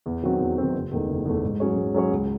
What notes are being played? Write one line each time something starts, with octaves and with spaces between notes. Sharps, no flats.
E2
D#3 F#3 C4 F#4
E2
D#3 F#3 C4 F#4
F#1
E2 D#3 A3
F#1
E2 D#3 A3
G#2
F#3 C#4 G#4 C#5
G#2
F#3 C#4 G#4 C#5
C#2